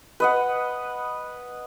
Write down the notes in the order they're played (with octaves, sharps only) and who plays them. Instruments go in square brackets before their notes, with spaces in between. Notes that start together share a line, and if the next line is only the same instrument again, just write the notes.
[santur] B4 D#5 F#5